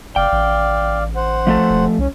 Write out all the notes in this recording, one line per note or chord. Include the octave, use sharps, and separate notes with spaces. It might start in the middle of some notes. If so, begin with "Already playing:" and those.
F#1 D5 F5 G5
A1
C5 F#5
F3 A3 A4
E1
C2 C#4